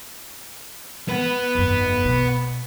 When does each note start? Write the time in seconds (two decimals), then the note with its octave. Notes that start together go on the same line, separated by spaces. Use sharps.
1.08 B3
1.55 F1 G2
2.05 B2